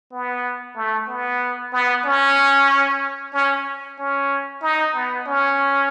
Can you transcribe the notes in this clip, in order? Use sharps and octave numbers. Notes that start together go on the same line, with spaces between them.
B3
A3
B3
B3
C#4
C#4
C#4
D#4
B3
C#4